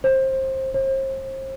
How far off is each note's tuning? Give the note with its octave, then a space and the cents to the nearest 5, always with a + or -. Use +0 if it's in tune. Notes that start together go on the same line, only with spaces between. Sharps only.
C5 +20
C5 +35